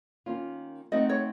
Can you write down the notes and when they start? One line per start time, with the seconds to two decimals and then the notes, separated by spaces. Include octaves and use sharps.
0.26 D#3 A#3 C#4 F4
0.92 A3 C4 D#4 F#4 D#5
1.09 C#5